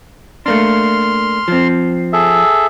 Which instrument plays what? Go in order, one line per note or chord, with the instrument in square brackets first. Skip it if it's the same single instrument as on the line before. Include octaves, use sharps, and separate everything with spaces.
[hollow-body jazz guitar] A3 A#3 D4 [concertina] C6 F6
[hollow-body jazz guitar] F3 C4
[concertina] G#4 A4 E5